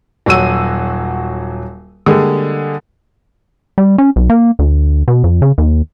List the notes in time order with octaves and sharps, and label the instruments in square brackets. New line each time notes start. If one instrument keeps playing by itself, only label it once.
[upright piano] D#1 F#3 F#4 E6 D#7
D3 G3 G#3 A#3 G#4
[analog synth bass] G3
C#4
B1
A#3
D2
B2
F2
C#3
D#2